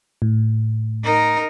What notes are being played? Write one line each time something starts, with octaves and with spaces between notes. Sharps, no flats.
A2
D#4 A#4